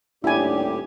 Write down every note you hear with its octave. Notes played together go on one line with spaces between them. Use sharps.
D#1 A2 D4 E4 G4 G#5